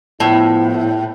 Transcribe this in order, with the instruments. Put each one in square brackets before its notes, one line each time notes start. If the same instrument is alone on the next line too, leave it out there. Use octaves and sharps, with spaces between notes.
[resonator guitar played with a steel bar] A2 [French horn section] F3 B3 E4